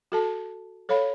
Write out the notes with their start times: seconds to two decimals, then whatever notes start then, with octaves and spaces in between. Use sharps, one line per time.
0.12 F#4 A4 A5
0.89 A4 C#5 F5 B5